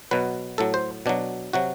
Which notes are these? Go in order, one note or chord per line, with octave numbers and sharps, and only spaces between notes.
B2 F#3 B4
A2 F#3 A4
C5
B2 F#3 D4
C3 F#3 F#4